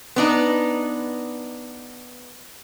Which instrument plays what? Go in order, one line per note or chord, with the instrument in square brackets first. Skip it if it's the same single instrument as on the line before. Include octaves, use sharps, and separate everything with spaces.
[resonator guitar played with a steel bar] B3 D4 D#4